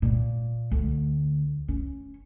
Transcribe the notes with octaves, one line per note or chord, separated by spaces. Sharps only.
A#2
D2
C#4